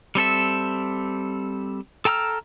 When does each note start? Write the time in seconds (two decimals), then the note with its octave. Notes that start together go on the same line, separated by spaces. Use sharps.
0.15 G3 C4 A4 E5
2.05 A4 G5 A#5 E6 F6